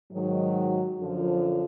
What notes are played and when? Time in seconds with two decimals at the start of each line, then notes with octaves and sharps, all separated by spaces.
0.12 G#2 D#3 F#3
1.00 F#2 D3 F3